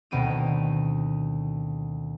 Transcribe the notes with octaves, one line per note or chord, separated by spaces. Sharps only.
D2 B2 D#3 C4 D7 D#7